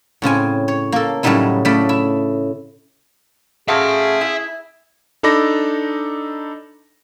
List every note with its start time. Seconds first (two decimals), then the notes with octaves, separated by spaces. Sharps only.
0.22 A2 C#3 C4 G#5
0.68 C#5
0.92 A#3 A4
1.23 A2 C#3 F#3 G3 D#4 E4
1.65 C#3 A3 D5 B5
1.89 E4
3.68 A3 F#4 G#4 E5 F5 C6
4.21 E4
5.23 D4 D#4 A4 B5 D6 A#6